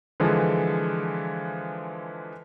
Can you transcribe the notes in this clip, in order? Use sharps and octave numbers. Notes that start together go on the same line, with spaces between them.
D3 E3 F3 G#3